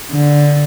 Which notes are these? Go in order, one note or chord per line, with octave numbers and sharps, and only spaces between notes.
D3